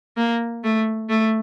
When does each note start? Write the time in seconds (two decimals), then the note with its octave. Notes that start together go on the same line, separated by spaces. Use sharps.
0.17 A#3
0.64 A3
1.09 A3